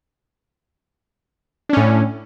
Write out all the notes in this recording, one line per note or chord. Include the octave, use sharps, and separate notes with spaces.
A2 C#4 D4